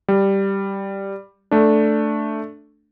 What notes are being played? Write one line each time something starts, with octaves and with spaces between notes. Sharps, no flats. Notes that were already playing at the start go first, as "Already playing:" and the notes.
G3
A3 D4